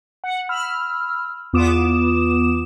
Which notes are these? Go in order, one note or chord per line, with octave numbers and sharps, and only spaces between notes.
F#5
B5 E6 F6
E2 B3 F4 D6 D#6 E7